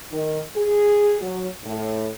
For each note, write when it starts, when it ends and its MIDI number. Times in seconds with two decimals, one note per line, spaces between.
0.11 0.40 51
0.55 1.16 68
1.20 1.47 54
1.64 2.07 45